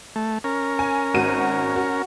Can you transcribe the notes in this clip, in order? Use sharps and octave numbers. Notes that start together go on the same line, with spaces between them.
A3
C#4 A#4
G#5
G#1 F#4 D#7
F#4